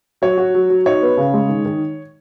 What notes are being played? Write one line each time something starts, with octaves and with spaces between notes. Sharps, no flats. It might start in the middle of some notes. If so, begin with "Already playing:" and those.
F#3 C#5
F#4
F#3
F#3
D#4 C#5
B3
C#3
G#3
D#3
D#3